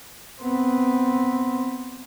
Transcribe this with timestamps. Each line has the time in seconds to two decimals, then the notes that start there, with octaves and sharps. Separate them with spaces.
0.42 B3 C4